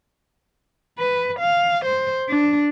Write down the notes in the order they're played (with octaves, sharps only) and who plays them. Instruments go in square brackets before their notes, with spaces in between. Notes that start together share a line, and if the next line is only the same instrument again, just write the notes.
[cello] B4
F5
C5
D4